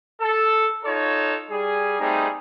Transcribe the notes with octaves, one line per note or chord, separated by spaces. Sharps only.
A4
D#4 F4 A4 C#5
G3 G#4
G3 A3 C4 D#4 G#4